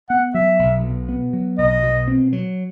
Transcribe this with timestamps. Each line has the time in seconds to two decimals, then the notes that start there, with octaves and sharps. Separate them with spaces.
0.10 B3 F#5
0.34 F#3 E5
0.59 B1
0.84 B2
1.09 B3
1.33 F#3
1.58 B1 D#5
1.83 B2
2.08 C4
2.33 F#3